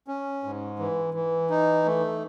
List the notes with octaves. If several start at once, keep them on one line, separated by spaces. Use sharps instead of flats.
C#4
G#2
E3
E3
D#4
A3